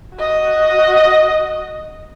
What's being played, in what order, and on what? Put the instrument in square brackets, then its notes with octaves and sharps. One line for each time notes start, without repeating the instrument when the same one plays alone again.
[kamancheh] F#4 D#5